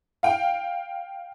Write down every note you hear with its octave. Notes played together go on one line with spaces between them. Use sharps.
F5 G5